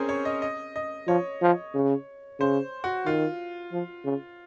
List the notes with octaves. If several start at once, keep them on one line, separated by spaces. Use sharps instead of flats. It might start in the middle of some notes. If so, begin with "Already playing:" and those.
Already playing: C4 C#4 G#4 A#4 C5
C#5
D#5
D#5
D#5
F3 C#5
F3
C#3
C#3 C5
F#4
D#3 F4
F3
C#3